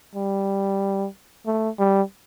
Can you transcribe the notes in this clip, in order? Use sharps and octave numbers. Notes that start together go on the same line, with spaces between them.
G3
A3
G3